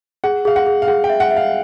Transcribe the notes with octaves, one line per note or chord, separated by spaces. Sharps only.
G#4 F#5
G#4 F5
F#5
G#4
F5
G#4 F#5
G5
E5
F#5
E5
F5